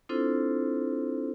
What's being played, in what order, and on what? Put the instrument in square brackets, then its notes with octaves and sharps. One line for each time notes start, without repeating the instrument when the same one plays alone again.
[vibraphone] C4 D4 E4 F4 A4 C5